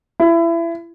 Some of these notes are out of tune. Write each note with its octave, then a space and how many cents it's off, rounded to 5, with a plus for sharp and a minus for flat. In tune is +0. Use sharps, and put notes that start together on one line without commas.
E4 +25